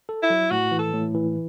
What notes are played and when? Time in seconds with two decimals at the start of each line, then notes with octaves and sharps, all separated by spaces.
0.09 A4
0.23 E4
0.30 F#3
0.51 A2 F#4
0.71 E3
0.79 A4
0.93 A2
1.14 E3